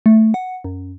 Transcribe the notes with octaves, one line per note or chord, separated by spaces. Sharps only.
A3
F#5
F#2